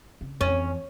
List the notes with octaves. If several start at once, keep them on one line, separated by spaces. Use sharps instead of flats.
C#3
F2 E3 C#4